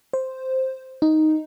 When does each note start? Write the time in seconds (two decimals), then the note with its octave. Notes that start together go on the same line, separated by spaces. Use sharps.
0.13 C5
1.02 D#4